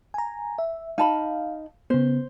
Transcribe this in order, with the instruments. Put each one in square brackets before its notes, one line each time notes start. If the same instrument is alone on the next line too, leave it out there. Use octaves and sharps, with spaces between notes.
[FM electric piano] G#5 A#5
E5
[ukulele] D#4 A5 B5 [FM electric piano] F5
[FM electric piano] C#3 B3 [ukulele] C5